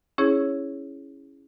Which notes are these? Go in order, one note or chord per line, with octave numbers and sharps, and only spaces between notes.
C#4 E4 G#4 C#5